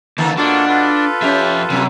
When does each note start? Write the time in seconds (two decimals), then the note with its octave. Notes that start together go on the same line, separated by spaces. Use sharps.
0.18 D2 D#3 A#3 B3 A5
0.37 B2 A#3 D4 F4 F#4 A4
0.69 F4 A4 B4
1.22 F2 C#4 G4 E5
1.70 F#2 C3 F#3